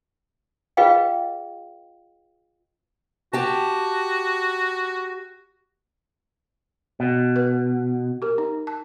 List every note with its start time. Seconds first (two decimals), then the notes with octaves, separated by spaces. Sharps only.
0.77 F4 G#4 B4 D#5 F5 G5
3.33 F#4 G4 A5
7.00 B2
7.36 B4
8.22 G4 A#4
8.38 D#4
8.67 A5